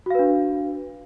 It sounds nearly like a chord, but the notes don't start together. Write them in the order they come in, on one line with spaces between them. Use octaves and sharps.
F#4 F5 B4 D4